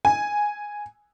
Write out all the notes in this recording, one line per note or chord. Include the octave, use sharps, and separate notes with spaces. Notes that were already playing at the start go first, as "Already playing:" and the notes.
G#5